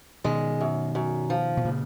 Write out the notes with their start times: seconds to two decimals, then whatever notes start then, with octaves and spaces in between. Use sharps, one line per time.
0.24 B2 D#3 G#3
0.61 F#2
0.95 F#2
1.30 F3
1.57 B2
1.65 A#2 C#3